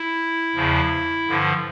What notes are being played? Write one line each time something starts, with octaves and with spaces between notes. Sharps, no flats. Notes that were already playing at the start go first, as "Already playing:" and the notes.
Already playing: E4
E2 C#3 F3
G2 D3 F3